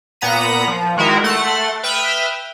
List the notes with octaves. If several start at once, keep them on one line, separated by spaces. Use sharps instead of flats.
A#2 B3 F#5 A#5 B6 D#7
F3
D#3 G#3 E4 F#4 A#4
A3 F#5 C6 A6
B4 E5 G5 D#6 F6